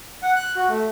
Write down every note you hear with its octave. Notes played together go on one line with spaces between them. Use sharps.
F#5
F#6
F#4
A3